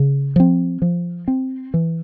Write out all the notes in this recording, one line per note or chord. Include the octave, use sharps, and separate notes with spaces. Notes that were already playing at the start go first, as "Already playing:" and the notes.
Already playing: C#3
F3 C4
F3
C4
E3